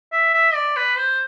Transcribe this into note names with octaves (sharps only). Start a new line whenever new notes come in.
E5
E5
D5
B4
C5